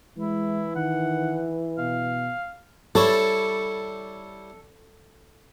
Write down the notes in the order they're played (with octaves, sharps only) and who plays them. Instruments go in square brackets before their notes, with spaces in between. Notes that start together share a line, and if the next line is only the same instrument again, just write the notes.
[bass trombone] E3 [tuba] G#3 [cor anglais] E4
[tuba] D#3 [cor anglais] F#5
[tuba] B2 [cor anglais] F5
[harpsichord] G3 E4 C#5 [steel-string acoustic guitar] A4